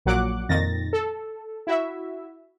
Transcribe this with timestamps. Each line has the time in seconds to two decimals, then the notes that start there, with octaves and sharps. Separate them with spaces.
0.06 A#1 A#2 F#3 F#5 D6 F#6
0.49 F2 A#2 D#3 A6 A#6
0.93 A4
1.67 E4 F#4 E5